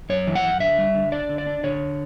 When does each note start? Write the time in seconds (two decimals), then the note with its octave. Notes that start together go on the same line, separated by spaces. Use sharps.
0.09 F#2 C#5
0.27 E3
0.35 F#5
0.44 F#2
0.60 D3 E5
0.78 G3
0.95 D3
1.12 D4 D5
1.29 D3
1.38 D5
1.47 D4
1.64 D3 C#5